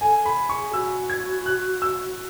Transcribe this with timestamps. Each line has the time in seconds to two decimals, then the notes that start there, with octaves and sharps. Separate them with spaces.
0.01 A4 G#5
0.26 B5
0.49 G#4 C#6
0.73 F#4 E6
1.10 G#6
1.46 F#6
1.82 E6